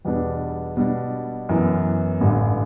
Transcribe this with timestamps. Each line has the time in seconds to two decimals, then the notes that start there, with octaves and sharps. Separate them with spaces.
0.05 E2 B2 G3 B3 D4
0.77 B2 G3 D4
1.49 F#2 E3 B3
2.21 A1 G2 D3